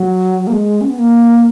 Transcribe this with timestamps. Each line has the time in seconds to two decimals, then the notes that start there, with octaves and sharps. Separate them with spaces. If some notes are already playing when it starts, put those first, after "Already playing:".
Already playing: F#3
0.47 A#3
0.52 G#3
0.81 C#4
0.90 B3
0.98 A#3